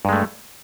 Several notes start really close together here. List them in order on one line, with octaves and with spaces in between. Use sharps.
G2 G#3 A3